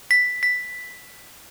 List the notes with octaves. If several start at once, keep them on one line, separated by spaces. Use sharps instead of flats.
B6
B6